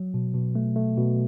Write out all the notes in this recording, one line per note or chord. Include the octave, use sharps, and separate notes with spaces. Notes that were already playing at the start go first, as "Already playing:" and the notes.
Already playing: F#3
B2
B2
A3
A3
B2